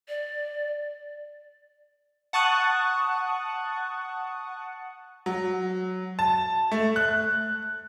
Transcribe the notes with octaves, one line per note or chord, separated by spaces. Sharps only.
D5
F#5 A5 C#6 D#6 F#6
F#3
A5
A3
F#6